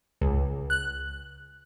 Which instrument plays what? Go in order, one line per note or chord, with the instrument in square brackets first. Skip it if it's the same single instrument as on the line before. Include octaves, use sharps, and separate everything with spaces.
[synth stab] C#2
F#6